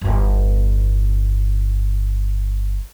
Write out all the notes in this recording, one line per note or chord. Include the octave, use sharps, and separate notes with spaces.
G1 E2